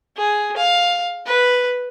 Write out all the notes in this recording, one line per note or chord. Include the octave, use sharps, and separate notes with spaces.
G#4
F5
B4